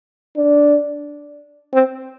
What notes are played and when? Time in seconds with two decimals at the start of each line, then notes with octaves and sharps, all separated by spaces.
0.37 D4
1.73 C4